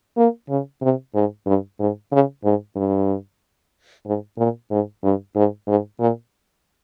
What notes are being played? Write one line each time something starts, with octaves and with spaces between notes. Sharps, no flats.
A#3
C#3
C3
G#2
G2
G#2
C#3
G#2
G2
G#2
A#2
G#2
G2
G#2
G#2
A#2